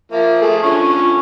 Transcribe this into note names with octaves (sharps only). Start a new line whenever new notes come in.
F3 A#3 E5
A3 G#4
D3 C#4 F4 C#6